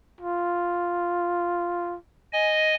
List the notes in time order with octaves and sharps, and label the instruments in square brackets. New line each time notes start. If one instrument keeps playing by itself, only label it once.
[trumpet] F4
[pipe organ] D#5 G#5